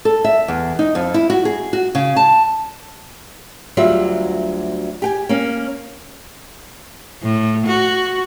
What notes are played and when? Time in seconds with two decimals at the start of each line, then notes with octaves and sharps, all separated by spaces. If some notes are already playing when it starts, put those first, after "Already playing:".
0.05 A4
0.24 E5
0.48 E2
0.79 D#4
0.95 F2
1.14 E4
1.30 F#4
1.45 G#4
1.73 F#4
1.95 C#3
2.16 A5
3.77 D2 F#3 G3 F4 E5
5.02 G4 G5 G#5
5.29 A#3 C#4
7.23 A2
7.68 F#4